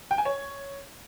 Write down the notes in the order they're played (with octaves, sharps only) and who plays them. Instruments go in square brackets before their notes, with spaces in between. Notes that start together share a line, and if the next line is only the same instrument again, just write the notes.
[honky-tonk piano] G5
G#5
C#5